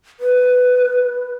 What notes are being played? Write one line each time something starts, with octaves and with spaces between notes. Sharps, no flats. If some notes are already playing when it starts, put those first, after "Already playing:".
B4